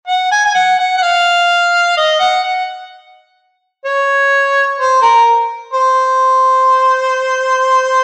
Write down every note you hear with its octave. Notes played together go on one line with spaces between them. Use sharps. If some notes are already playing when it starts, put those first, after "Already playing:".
F#5
G#5
G#5
F#5
F#5
F#5
F5
D#5
F#5
F#5
C#5
C5
A#4
C5